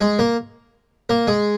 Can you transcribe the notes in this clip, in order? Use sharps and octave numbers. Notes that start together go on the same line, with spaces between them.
G#3 G#4
A#3 A#4
A#3 A#4
G#3 G#4